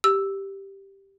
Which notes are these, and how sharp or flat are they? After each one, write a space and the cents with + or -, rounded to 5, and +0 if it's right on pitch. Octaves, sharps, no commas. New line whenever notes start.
G4 +0 E6 +0